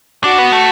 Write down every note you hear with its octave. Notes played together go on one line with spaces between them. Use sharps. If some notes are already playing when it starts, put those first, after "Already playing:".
D4 F#4
B3
A3